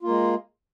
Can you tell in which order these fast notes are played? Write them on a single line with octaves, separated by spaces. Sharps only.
F4 A#3 G#3